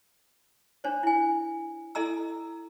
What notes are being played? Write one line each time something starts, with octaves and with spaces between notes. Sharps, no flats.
D4 C5 C#5
E4 G#5
E4 A4 D#5 A#5 E6